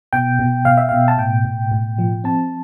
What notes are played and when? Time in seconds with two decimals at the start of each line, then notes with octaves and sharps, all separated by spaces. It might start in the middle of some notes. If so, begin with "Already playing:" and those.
0.13 B2 G5
0.39 B2
0.65 B2 F5
0.77 E5
0.89 B2 F5
1.08 A5
1.18 A2 G5
1.45 A2
1.71 A2
1.98 F3
2.24 C4 A5